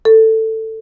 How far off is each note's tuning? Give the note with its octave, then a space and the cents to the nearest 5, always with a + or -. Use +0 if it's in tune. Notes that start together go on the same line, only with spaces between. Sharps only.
A4 +10